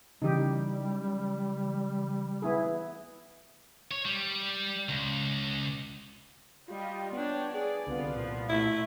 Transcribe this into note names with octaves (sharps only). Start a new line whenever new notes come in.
C#3 E3 G3 D#4 G4
B3 E4 G#4
C#5
G3
C#2
G3 F4 G4 D#5
B3 D4 C#5 G5
G#4 D5
C2 D3 B3 F4
A#2 F3
A3 E4